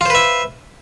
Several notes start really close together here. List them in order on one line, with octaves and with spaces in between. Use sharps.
F4 C5 B4 E5